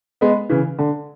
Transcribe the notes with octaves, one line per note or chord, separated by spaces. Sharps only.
G#3 B3
C#3 E3
D3